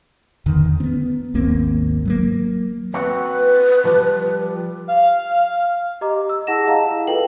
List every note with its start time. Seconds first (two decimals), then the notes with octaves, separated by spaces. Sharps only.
0.46 E2 D3 D#3
0.80 B3 C4
1.34 G#1 D#2 A#3 C4
2.05 F#3 G#3 A#3
2.94 C4 F#4 B4
3.85 F3 G3
4.86 F5
6.01 G4 D#5 A#5 D6
6.29 E6
6.47 E4 G#4 F#5 A5 A#6 E7
6.67 D#5 F5 A5 A#5
6.83 F#5
7.07 E4 F4 A4 B4 G5 F#7